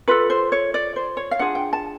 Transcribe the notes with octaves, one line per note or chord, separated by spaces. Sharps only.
F4 A4 B4
C5
C#5
D5
C5
C#5
F5
D4 F4 G#4 F#5
G5
A5